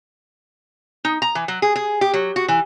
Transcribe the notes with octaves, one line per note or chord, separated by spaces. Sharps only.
D#4
A#5
E3
F#3
G#4
G#4
G4
F#3
F#4
E3